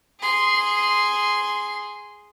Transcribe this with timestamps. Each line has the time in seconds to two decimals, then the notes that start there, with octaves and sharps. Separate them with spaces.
0.20 G#4 C6